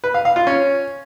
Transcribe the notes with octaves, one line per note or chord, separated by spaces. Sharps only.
B4
F5
F5
F4
C#4